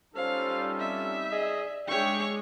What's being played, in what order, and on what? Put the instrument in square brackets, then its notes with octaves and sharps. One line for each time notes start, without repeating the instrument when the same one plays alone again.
[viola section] G3 D#4 [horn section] C#4 F4 A4 [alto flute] C5 [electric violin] F5
[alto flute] C4 [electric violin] E5
[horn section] G#4 D#5 [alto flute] D5
[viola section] G#3 D4 G#4 [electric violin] C#5 C#6 [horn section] E5 G5